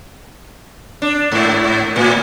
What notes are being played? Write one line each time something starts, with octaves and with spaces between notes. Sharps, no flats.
D4
G#2
A2